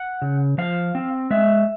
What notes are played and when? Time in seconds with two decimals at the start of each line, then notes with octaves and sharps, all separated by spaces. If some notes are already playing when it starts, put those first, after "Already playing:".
Already playing: F#5
0.22 C#3
0.58 F3 F5
0.95 C4
1.31 G#3 E5